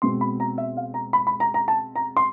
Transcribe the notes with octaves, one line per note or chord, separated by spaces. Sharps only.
B2 G#3 C4 C6
B5
A#5
E5
F5
A#5
B5
B5
A#5
A#5
A5
A#5
C6